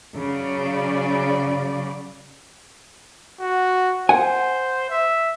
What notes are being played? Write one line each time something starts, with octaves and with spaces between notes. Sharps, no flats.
C#3 F#3 C#4 D5
F#4
C5 F#5 G#5
E5